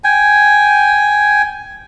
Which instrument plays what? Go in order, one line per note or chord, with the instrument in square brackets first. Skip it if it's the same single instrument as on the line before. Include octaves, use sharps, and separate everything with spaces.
[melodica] G5 G#5